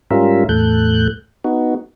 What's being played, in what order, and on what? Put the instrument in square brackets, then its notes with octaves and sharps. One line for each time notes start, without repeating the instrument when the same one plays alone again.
[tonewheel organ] G#2 G3 C#4 F4 A#4 E5
E2 A2 A4 F#6 G6
B3 D#4 F#4